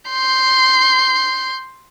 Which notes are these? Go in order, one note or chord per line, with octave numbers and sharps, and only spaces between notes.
C6 G6